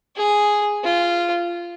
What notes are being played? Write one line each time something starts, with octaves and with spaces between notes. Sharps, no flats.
G#4
F4